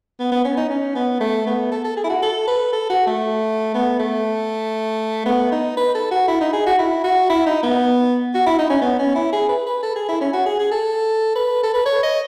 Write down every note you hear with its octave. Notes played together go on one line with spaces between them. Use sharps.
B3
B3
C#4
D#4
C#4
B3
A3
B3
A4
A4
G#4
E4
F#4
A4
B4
A4
F#4
A3
B3
A3
B3
D#4
B4
A4
F#4
E4
D#4
G#4
F#4
E4
F#4
E4
D#4
B3
F#4
E4
D#4
C#4
B3
C#4
E4
G#4
B4
B4
A4
G#4
E4
C#4
F#4
G#4
G#4
A4
B4
A4
B4
C#5
D#5